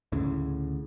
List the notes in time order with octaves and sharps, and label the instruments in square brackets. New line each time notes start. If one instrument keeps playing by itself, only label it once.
[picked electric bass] D2 A2 C#3